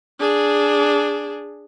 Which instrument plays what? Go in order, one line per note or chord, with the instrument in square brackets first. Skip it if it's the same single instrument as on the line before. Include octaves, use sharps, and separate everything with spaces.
[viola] D4 G#4